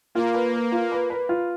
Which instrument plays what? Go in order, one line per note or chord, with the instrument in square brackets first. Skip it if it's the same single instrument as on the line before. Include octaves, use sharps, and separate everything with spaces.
[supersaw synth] A#3 [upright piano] F4
[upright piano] B4
B4
F4
B4
B4
F4